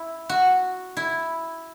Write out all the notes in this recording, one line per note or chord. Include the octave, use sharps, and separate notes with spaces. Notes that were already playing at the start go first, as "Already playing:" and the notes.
Already playing: E4
F#4
E4